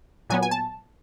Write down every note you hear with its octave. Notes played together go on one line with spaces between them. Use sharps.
A#2 F#3 B3 G#5
G#5
A5